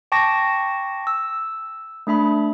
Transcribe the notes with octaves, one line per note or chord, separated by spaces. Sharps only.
G5 A5 C#6 D6 A#6
E6
A3 D4 E5 B5